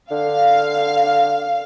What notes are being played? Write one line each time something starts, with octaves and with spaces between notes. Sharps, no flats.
D3 F5